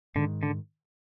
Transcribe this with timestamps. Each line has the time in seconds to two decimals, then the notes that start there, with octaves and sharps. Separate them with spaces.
0.15 G#2 D3 D#3 G#3
0.43 D3